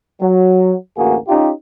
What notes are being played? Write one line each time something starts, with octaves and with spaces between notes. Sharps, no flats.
F#3
A1 D2 A#3 F#4 G#4
C#4 D#4 F4 G4